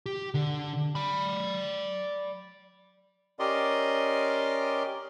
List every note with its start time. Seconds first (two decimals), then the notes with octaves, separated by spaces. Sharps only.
0.06 G4
0.34 D3
0.95 D5 B5
3.39 C#4 G4 A#4 D5 D#5 C6